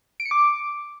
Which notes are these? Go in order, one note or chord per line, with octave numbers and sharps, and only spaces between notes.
D7
C#7
D6